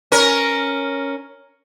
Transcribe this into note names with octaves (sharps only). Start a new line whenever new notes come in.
C#4 A#4